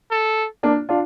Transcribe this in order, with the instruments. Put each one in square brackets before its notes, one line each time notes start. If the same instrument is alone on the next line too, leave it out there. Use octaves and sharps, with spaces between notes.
[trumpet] A4
[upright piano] A#3 D4
D4 F4